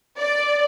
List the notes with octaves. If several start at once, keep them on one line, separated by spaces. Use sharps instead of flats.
D5